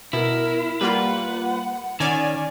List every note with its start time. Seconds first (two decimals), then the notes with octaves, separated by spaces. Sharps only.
0.13 B2 E4 A#4
0.81 G3 A#3 F4 B4 F#5
2.00 D#3 C#4 D5 G#5